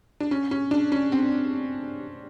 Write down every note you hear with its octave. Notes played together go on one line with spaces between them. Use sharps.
D4
C#4
C#4
D4
C#4
C4